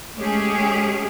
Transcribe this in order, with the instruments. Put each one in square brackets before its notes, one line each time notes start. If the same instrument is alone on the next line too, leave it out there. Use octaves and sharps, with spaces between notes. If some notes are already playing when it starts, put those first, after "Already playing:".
[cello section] G#3 A3 C#4 G4 G#4